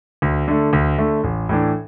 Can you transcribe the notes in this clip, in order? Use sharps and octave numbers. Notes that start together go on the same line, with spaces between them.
D2
D3 A3
D2
D3 A3
A1
A2 E3 D4